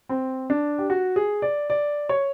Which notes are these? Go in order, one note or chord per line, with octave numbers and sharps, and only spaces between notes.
C4
D4
G4
F#4
G#4
D5
D5
C#5